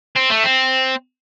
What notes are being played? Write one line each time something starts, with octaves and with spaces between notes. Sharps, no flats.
C4
A3
C4